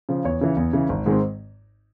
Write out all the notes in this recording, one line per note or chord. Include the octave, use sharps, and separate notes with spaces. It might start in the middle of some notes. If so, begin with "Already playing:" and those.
C#3 F3
E2 C#5
C#3 E3
E2
C#3 E3
G#1
G#2 D#3 G#3 C4